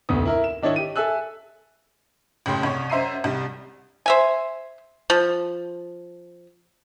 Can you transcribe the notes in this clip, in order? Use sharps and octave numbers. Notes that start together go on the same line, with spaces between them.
F1 D2 B3 D#6
E4 A#4 E5
E7
D#3 D4 E4 C#5 D#5
G4 D#7
A4 E5 G#5 E6 F#6
F#1 A2 C#3 G4 C6
C2 C#5
F#2 C5 E5 A#5 C7 D#7
C2 G3
C5 E5 G#5
F3